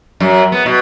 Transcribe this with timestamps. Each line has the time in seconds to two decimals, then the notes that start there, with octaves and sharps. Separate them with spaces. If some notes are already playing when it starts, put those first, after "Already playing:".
0.20 F#2
0.52 B3
0.66 B2